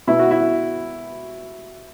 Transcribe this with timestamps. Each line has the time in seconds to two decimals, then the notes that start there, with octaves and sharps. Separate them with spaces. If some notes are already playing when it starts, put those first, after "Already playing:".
0.07 B2 E4
0.19 F#4
0.31 E4